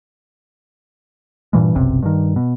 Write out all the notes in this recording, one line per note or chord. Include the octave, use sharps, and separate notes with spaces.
G2 A#2 E3 G#3
F#1 B1 C3
G2 D#3
B2